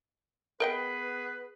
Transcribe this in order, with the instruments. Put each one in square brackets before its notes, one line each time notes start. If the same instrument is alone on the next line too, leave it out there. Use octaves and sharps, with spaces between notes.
[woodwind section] B3 G#4 B4 [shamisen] A#4 D#5 G5